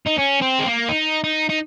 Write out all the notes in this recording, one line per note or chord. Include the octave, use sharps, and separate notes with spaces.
D#4
C#4
C4
G#3
A#3
D#4
D#4
D#4